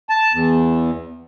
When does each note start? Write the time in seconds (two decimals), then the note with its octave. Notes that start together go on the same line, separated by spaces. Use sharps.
0.09 A5
0.33 E2